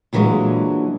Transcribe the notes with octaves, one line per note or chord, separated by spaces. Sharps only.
A#2 D3 E3 F#3 G#3